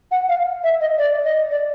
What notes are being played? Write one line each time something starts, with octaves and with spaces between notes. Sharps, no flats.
F#5
F5
E5
D#5
D5
D#5
D5